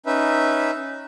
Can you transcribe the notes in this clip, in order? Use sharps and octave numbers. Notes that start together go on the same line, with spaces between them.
C#4 D#4 B4 E5